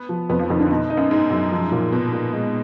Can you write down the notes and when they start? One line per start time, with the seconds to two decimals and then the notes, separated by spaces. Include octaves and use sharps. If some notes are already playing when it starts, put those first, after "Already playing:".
Already playing: B3
0.09 F3
0.29 F2 B3
0.39 F3
0.50 F2 D#3
0.60 D3
0.70 B2 D#4
0.90 D#4
0.97 F#2
1.10 G#2 D#4
1.30 F#2
1.52 F3
1.72 A#2
1.92 B2 F3
2.13 A#2
2.33 G#3